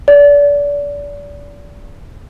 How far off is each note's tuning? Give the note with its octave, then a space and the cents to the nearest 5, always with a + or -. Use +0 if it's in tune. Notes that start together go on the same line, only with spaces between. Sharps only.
D5 -30